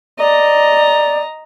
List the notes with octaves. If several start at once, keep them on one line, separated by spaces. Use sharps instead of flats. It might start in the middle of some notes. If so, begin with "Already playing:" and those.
D5 D#5 A#5